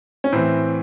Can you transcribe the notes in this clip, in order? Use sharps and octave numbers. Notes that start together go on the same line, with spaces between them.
C#4
A2 E3 C4